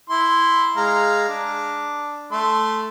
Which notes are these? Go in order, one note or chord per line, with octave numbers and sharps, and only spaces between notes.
E4 C6
G#3 F5 A#5
D4
A3 C6